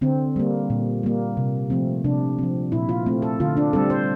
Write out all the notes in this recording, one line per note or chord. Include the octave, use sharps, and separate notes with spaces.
D3 C4
G3 A#3
A#2
G3 A#3
C3
F3 A3 C4
C3 D4
F3 C4
A#2 E4
F4
A3 C4
A4
D3 F4
D4
G3 C4 A4
C5